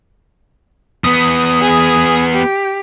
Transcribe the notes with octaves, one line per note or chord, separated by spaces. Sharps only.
E2 B3 D#6
G#4
G4